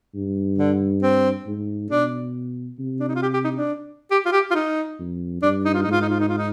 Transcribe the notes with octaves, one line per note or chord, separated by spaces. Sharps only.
G2
D3
C4
G#2
B2 D4
C3
D4
D#4
F4
G4
G4
D#4
D4
G4
F4
G4
F4
D#4
F2
G2 D4
D#4
F4
D#4
G#2 F4
D#4
F4
D#4
F4
D#4